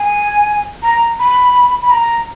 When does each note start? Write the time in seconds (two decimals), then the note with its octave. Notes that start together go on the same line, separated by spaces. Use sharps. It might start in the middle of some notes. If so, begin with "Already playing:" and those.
Already playing: G#5
0.83 A#5
1.19 B5
1.82 B5
1.91 A#5